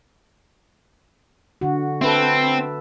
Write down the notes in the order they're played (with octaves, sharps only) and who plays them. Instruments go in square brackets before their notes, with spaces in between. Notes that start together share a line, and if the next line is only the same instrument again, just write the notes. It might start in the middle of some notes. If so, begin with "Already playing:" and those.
[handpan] D3 F#4
[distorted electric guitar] C4 [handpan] A4 B4 E5